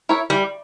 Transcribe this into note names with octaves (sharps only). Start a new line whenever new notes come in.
E4 A#4 C#5 E5
E3 G3